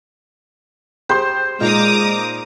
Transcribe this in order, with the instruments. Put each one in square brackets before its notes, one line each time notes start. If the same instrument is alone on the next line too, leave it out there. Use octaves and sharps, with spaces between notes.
[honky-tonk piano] G4 G#4 C6 [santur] C5
[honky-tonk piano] A#2 D#4 F4 [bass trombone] G#3 [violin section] A#5 D6 D#6